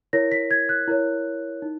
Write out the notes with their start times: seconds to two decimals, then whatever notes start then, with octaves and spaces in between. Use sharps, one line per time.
0.13 E4 A#4 C#5 A#6
0.32 B6
0.51 G#6
0.69 F#6
0.88 E4 A#4 C#5
1.62 D#4